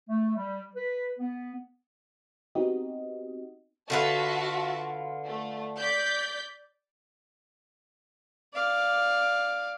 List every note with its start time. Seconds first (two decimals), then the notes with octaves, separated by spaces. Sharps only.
0.09 A3
0.37 G3
0.76 B4
1.19 B3
2.55 B3 C4 D#4 F#4 G4 D#5
3.90 D3 F4 F#4 B4 E5 A5
5.27 A3
5.79 D5 G6 B6
8.54 D5 F5